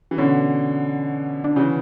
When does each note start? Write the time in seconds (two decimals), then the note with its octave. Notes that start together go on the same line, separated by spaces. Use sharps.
0.11 E3
0.18 B2 D3 C#4
1.44 D4
1.56 C#3 E3 C#4